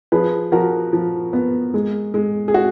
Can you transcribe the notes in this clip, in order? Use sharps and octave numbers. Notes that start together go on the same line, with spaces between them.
F3 G#4 B4
F3 F#4 A#4
F3
B3
G#3
G#3
G#4
F#4